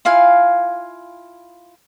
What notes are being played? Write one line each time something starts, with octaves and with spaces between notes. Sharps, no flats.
E4 F4 F5 G#5